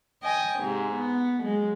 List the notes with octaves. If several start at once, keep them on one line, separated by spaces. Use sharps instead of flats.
D#5 G5 G#5
G#2 C3
B3
F#3 G#3